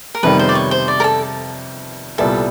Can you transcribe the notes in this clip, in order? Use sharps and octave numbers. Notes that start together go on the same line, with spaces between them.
A#4
F2 C3 D#3 G3 B3 B4
C5
D5
C#5
C5
D5
A#4
A4
C2 A#2 G3 B3 E4 A4